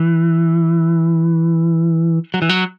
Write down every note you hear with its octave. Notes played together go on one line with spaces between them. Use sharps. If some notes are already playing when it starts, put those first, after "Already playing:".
Already playing: E3
F#3
E3
F#3